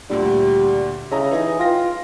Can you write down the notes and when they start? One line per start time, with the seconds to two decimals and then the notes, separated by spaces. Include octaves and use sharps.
0.10 D2 A#2 D3 G3
1.11 C#3 E4 D#5 A#5
1.31 E3 D#4 G#4 D#5
1.59 F4 G5 A#6